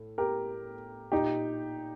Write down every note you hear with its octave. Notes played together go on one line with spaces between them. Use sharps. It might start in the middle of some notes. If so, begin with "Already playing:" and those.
Already playing: A2
G4 A#4
A#2 D#4 G4